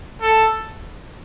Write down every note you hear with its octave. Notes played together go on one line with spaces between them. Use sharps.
A4